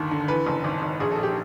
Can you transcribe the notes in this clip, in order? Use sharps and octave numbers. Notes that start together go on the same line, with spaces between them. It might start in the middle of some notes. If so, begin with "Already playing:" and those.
Already playing: G1 D#2
D3
E2 B4
F#1
G#1
G#1
A#1 G#4
A4
A#1
G4